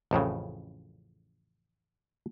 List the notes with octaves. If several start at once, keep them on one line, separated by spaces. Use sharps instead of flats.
A1 F2 A2 C#3